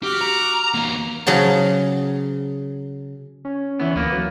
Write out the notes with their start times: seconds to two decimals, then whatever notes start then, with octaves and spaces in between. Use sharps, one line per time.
0.03 F#4 G4 D6 F6
0.21 A#5
0.74 E2 A#3
1.27 C#3 F#3 G#4 A5
3.45 C#4
3.80 E2 E3 B3
3.96 D2 A#3 B3
4.12 F#3